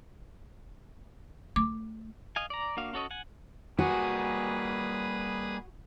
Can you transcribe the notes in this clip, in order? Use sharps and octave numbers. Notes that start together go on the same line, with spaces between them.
A3 D6
D#5 F5 G#5
D5 A#5
A#3 D4 F#4 F5
C#4 F#4 A4 C#5 D#5
F#5 G#5
G3 A#3 F#4 G#4 B4 G#5 D#6